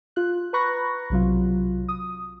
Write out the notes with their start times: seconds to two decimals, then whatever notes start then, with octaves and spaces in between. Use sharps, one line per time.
0.16 F4 F#6
0.53 B4 A#5 B5 C#6 F#6 A#6
1.10 B1 C3 F#3 F4
1.89 D#6